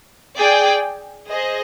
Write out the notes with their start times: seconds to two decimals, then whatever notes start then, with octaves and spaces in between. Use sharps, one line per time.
0.37 G#4 D5 G5
1.30 G#4 C5 D#5